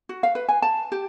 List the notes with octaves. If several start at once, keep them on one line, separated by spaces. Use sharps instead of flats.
F#4
F5
B4
G#5
A5
G4